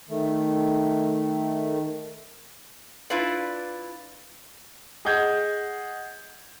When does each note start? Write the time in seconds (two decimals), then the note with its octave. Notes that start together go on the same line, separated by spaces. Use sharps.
0.09 D#3 A3
3.10 D4 E4 F4 B4 D5
5.05 G#4 D#5 F#5 G6 G#6